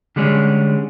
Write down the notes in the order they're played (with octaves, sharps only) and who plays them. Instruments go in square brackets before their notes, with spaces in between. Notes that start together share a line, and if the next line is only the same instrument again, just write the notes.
[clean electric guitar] D3 G3 G#3 C#4